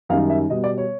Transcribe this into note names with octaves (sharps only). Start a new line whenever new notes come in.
F#2 D#3 G3 F5
E5
B2 G3 D#5
D5
C#5